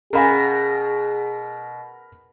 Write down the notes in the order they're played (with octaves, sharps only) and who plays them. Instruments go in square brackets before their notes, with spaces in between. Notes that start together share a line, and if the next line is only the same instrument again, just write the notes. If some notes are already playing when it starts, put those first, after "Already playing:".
[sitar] B2 [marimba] C#4 F5 G#5 [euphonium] G#4 [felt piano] A#4 B5